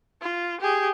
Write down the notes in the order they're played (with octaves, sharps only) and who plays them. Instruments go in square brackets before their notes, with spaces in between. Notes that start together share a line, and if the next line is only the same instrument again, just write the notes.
[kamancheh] F4
G4 G#4